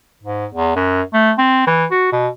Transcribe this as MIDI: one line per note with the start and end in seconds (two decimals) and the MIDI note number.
0.23 0.46 44
0.54 0.74 40
0.76 1.02 42
1.14 1.32 57
1.38 1.63 60
1.67 1.85 52
1.91 2.11 66
2.13 2.28 47